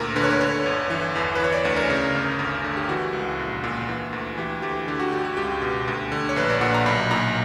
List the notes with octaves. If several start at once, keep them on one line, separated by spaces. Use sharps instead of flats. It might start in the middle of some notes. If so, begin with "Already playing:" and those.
Already playing: D2 A#2 A#4
D3 B4
C#5
B4
D3 C#5
G1
E3
E2
B4
E3 C#5
D5
D2 C#5
A#4
C#3
G1
D2
D3
G4
E3 F#4
C#2
A#1
A#2
E3
D2
E3 G4
D2 G4
D3 G4
F#4
G1 G4
F#4
C#2 G4
B2
D2
D3
C#5
A#1 B4
D5
A#2 F#5
A#5
B1 B5
A#2 A#5